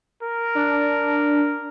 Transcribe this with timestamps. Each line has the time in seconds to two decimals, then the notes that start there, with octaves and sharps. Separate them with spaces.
0.23 A#4
0.55 D4